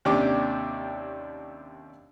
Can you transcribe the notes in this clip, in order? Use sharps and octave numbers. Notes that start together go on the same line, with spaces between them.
D#2 C3 C#4 D4 G4 D6